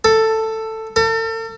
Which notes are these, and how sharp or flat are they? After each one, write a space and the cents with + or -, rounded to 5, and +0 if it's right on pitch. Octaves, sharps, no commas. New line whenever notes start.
A4 +10
A4 +40